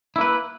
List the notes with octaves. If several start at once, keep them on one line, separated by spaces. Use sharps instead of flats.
A#3 E4 B4